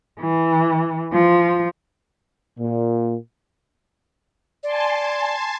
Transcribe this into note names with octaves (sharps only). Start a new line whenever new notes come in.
E3
F3
A#2
D5 G#5 A5 C6